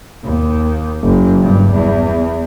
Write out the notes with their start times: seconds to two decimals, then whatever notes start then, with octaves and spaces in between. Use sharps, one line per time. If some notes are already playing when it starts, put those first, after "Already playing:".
0.24 D#2
1.03 F#1
1.42 G2
1.73 E2